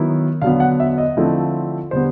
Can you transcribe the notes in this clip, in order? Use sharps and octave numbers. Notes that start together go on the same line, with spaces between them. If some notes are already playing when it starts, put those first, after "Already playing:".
Already playing: D#3 F#3 B3 E4
D3 F#3 B3 F5
F#5
E5
D#5
D3 F3 A3 C4 E4
D3 G3 B3 C5